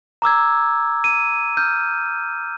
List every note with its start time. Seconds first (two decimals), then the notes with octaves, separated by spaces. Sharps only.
0.22 A#5 D6 E6 G#6
1.04 D#7
1.57 F6 G6